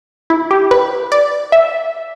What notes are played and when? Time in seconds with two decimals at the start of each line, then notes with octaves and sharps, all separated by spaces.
0.30 E4
0.51 G4
0.71 B4
1.12 D5
1.52 E5